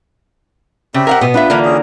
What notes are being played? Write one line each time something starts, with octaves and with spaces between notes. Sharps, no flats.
C#3 C4 G4 E5
A#4 F5 F#5
B2 B3
D4 F4 B4 E5
D3 E3 A#3
C#4 G#4